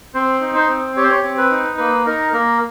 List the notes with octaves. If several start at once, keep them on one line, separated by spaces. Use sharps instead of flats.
C4 C5
D#4
C5
C4
G4 C#5
C5
C#5
C4
B4
D#4
A#3 B4
D#4 A#4
A#3 A#4